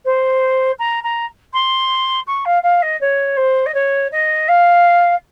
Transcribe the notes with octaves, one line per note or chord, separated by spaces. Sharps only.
C5
A#5
A#5
C6
C#6
F5
F5
D#5
C#5
C5
D#5
C#5
D#5
F5